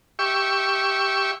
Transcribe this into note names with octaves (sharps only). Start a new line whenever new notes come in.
G4 E5 C#6